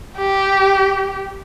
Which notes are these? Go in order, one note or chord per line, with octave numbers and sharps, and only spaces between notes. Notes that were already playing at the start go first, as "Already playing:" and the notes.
G4